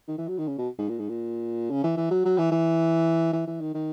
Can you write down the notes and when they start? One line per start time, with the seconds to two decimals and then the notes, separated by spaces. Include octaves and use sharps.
0.08 D#3
0.18 E3
0.28 F#3
0.38 D#3
0.47 C#3
0.58 B2
0.79 G#2
0.89 A#2
0.99 G#2
1.09 A#2
1.70 C#3
1.84 E3
1.97 E3
2.11 F#3
2.25 F#3
2.38 E3
2.52 E3
3.33 E3
3.47 E3
3.61 D#3
3.74 D#3